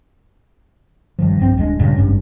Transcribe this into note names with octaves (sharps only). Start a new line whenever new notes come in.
G2 D#3 F3
A#1 G2 C4
D#1 G#3 D4
D1 G2 A#2 C#3
G#1 G2 C#4